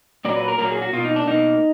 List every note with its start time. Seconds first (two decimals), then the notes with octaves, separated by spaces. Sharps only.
0.25 A#2 F#3 A#3 D5
0.36 B4
0.48 A#4
0.58 A#2 F#3 A#3 A#4
0.71 G#4
0.82 F#4
0.93 B2 A#3 F4
1.05 D#4
1.16 D4
1.27 B2 A#3 D#4